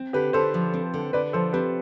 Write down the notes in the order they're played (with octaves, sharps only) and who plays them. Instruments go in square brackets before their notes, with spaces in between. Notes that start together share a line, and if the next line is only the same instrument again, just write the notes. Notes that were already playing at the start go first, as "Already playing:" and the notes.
Already playing: [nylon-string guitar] C4
[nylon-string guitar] D3 [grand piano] G4 B4
[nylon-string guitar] D3 [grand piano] A4 C5
[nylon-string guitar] F3
C4
D3
[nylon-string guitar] D3 [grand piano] B4 D5
[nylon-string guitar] F3 [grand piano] A4 C5
[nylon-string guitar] C4 [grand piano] G4 B4